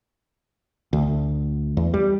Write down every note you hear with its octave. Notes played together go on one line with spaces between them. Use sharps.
D2
E2
G3